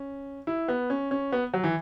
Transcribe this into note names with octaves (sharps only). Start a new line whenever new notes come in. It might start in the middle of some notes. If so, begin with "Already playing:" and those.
Already playing: C#4
E4
B3
C#4
C#4
B3
F#3
E3